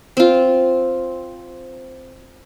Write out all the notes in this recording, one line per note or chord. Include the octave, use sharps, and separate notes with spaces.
C4 F4